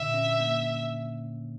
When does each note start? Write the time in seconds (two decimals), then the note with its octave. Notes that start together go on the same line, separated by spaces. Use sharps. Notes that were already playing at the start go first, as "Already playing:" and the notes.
Already playing: A#2 D3 E5
0.14 C#4
0.40 A#3